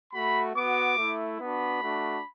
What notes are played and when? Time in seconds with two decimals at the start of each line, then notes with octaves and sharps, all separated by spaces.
0.13 A3 F#4 B5
0.55 B3 F#4 D6
0.97 A3 E4
1.40 B3 D4 F#4 B5
1.82 A3 D4 F#4